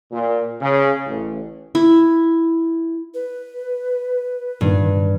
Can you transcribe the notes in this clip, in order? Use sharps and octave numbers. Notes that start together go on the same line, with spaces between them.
A#2
C#3
A1
E4
B4
G2 A#2 D#3